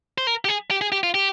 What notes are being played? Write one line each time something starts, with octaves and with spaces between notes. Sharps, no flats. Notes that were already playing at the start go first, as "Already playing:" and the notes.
C5
A#4
G4
G#4
G4
G#4
G4
F4
G4